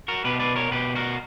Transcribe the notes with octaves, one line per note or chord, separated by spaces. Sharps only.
F#4 A#4
B2 G4 B4
B4 D5
A#4 C#5
B2 G4 B4
F#4 A#4